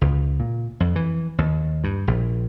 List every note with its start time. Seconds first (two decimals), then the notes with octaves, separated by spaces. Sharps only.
0.01 C#2
0.40 A#2
0.80 F2
0.96 E3
1.38 D#2
1.84 G2
2.08 A#1